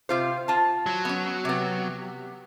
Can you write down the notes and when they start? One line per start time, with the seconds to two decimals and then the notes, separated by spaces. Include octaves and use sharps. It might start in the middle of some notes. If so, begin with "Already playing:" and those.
0.09 C3 F4 C5
0.48 F4 A5
0.86 F#3
1.05 B3 C#4
1.45 C3 B3